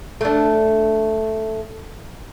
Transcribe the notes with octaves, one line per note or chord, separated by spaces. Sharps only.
A3 D4